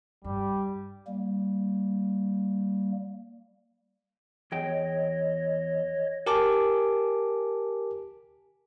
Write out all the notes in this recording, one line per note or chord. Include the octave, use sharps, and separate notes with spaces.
G2 G3
G3 A#3
E2 G#4 C#5 D#5 G5
G4 A#4 G#5 A5 D6